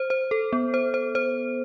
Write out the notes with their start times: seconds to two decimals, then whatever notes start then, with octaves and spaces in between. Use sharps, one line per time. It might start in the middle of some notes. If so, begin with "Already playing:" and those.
Already playing: C5
0.10 C5
0.31 A4
0.53 B3
0.74 C5
0.94 C5
1.15 C5